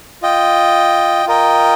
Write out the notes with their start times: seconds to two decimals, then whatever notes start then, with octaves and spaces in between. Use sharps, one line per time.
0.22 F4 D#5 G5
1.26 F4 A#4 D#5 G5